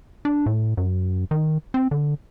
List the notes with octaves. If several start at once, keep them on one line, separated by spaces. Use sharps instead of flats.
D4
A2
F#2
D#3
C4
D3